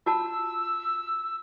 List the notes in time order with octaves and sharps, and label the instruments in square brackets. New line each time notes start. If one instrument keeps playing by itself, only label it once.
[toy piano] F4 F#4 A5 [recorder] E6